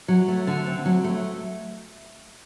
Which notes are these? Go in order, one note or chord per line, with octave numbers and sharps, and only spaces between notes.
F#3
A3
D3
C4
F#3
A3